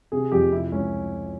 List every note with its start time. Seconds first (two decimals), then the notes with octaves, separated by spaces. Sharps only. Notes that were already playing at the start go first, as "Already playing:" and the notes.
0.12 C3 G#4
0.32 F2 G4
0.52 C3 E4
0.72 C#2 C#4